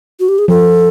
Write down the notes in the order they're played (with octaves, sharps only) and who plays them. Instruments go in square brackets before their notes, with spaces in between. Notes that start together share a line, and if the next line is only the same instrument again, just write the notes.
[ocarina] F#4
G4
G#4
[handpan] F3 [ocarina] A4